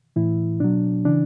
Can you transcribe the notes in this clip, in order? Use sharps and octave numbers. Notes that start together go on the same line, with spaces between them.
A2 E3 E4
B2 F#3 D4
C#3 E3 D4